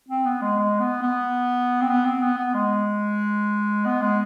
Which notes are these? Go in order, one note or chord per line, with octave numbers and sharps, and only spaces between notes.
C4
B3
G#3
G#3
B3
B3
C4
B3
C4
B3
B3
G#3
B3
G#3